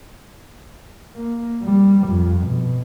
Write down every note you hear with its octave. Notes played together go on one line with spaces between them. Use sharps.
A#3
G3
F2
B2